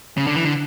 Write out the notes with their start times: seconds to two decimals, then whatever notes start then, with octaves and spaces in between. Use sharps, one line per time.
0.17 C#3
0.27 D3
0.35 E3
0.45 D3